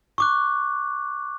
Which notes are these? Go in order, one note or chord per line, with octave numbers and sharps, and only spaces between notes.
C#6 D6 F#6